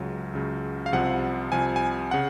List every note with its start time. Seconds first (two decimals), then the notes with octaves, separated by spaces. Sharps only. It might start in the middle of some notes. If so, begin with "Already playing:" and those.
Already playing: C#2 C#3 F#3
0.33 C#2 C#3 F#3
0.86 F5
0.92 C2 C3 F3 F#5
1.52 C2 C3 F3 G#5
1.76 G#5
2.11 C#3 F#5